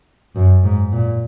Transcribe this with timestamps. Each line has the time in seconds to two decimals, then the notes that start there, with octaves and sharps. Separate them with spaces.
0.35 F#2
0.63 G#2
0.92 A#2